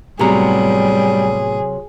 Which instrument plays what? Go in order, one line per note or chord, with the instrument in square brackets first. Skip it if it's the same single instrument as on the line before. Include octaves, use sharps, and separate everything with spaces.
[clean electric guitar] A2 B3 A#5 [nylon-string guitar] C3 F#3 [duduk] G3 [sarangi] G#4